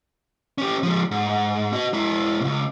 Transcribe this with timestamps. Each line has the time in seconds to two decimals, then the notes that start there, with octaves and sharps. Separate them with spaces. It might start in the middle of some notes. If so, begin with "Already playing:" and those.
0.58 C#4 G4
0.83 F3 G#3
1.11 G#2
1.73 F#4 D#5
1.94 G#3 E4
2.41 C#2 B2